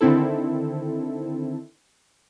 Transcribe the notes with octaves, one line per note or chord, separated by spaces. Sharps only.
D3 D#3 C4 E4 A4